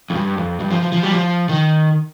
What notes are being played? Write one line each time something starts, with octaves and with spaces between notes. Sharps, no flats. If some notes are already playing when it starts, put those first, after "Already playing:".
F2
G2
F2
G2
F3
F3
F3
G3
F3
D#3